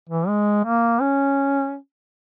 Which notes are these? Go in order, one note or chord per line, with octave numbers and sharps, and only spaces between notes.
E3
G#3
A#3
C#4